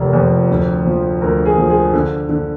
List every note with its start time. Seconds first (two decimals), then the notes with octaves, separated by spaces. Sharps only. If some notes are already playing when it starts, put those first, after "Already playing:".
Already playing: F1 F2 C3 A#4
0.13 F2
0.50 D2
0.85 F3
1.22 D2 A#4
1.46 G#4
1.58 F3
1.70 G#4
1.93 D3
2.29 D3